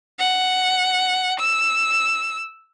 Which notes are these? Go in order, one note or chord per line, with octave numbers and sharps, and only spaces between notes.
F#5
E6